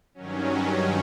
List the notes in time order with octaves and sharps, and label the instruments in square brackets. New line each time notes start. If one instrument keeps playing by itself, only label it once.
[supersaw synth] G2 D#3 F#3 C#4